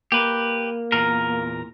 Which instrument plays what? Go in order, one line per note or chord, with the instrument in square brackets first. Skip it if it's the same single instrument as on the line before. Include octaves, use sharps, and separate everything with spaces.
[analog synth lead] A#3 [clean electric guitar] G4 B4
[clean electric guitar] E2 A#2 A#4